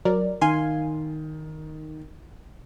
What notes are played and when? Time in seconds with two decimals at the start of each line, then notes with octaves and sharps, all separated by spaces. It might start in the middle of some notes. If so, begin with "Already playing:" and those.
0.05 F#3 A#4 D5
0.41 D#3 F5 G#5 C6